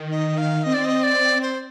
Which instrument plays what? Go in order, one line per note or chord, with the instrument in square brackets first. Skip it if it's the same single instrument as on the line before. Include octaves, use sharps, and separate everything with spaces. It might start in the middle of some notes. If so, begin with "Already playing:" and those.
Already playing: [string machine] D#3
[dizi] D#5
F5
[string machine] C4 [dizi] D#5
[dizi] D5
D#5
D5
C5